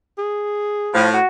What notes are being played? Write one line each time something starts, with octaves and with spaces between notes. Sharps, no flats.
G#4
A2 F3
F#4